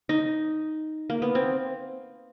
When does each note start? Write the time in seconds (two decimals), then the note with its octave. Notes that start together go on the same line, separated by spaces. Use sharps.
0.09 D#4
1.10 A#3
1.22 B3
1.35 C4